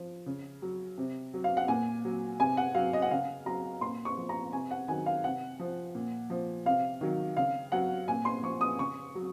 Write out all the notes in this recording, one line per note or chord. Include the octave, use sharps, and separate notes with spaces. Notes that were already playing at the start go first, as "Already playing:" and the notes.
Already playing: F3
C#3
F#3
C3
F#3
F5
F#5
A#2 G#5
F#3
C3 G#5
F#5
F#3 F5
D#5
F#5
C#3 F5
F#3 A#5
A#2 C6
C#6
F3
A#5
C3 G#5
F#5
D#3 F#3 G#5
F5
C3 F#5
F3
A#2
F3
C3 F5
D#3 F#3
C#3 F5
F#3 F#5
A#2 G#5
C6
F3 C#6
D#6
C#3 C#6
F#3